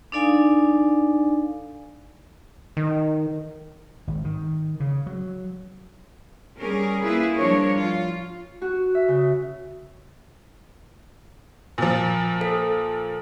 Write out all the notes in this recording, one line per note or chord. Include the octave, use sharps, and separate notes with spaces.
D4 D#4 A4 D5 F5 G#5
D#3
G#1
D#3
C#3
F#3
G3 C#4 G#4 A#4
A#3 E4 F4 G#4 B4
F3 G3 D4 A#4 C#5
F4
F#4
E5
C#3
A#2 F3
A4